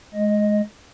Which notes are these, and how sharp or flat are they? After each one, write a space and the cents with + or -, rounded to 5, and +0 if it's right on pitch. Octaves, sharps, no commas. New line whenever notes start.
G#3 +25 D#5 +0